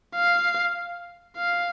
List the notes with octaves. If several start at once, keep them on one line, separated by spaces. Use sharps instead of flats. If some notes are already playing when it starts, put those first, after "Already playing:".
F5
F5